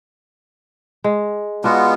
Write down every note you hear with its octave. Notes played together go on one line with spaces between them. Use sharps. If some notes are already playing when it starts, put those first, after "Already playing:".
G#3
G#3 B3 D4 F4 F#4